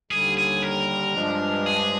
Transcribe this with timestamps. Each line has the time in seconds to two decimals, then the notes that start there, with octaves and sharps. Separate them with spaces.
0.11 D#2 D3 G3 G#4
0.37 G#4
0.62 A#4
1.15 G2 F3 G#3 D4
1.66 G#4